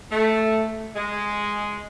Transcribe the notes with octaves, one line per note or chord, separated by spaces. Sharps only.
A3
G#3